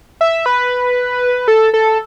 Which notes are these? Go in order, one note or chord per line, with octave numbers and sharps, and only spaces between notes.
E5
B4
A4
A4